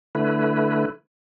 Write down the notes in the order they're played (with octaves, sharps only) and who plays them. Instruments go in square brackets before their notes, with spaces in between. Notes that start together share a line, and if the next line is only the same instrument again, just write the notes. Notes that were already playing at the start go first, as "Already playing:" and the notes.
[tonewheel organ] D3 A3 E4 B4